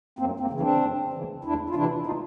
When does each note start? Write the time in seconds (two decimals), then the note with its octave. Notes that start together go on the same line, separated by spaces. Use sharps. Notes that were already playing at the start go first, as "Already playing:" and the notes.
0.19 F#2 A#3 C4
0.40 A#3 C4
0.50 C#3 E3
0.60 C4 D4
0.81 F#2
1.12 C#3 E3
1.44 E2 D4 E4
1.70 F4
1.75 C3 E3 D4 E4
2.06 D#4 F4